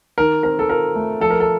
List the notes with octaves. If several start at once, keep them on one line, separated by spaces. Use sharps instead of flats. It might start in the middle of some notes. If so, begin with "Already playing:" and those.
D#3 A#4
C4 A#4
A4
F4 A#4
A3
F3 A4
A#4
A4